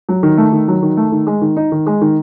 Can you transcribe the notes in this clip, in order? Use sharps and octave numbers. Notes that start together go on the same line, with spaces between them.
F#3
D#3
A3
D#3
F#3
D#3
A3
D#3
G#3
D#3
D#4
D#3
G#3
D#3